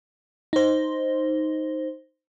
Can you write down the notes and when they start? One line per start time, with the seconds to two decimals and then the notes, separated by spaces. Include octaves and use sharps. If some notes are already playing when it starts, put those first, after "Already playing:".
0.53 D#4 C5